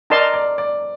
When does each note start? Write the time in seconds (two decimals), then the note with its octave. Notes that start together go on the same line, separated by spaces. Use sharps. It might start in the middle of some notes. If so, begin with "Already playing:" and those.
0.10 D#4 A#4 D5 D#5 A5 C6
0.34 D5
0.58 D5